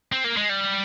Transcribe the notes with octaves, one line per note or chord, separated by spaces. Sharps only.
C4
A#3
G#3
G3